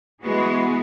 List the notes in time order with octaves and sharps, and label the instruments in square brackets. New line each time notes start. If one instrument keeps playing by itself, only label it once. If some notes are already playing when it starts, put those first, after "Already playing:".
[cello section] E3 G#3 B3 F#4 G#4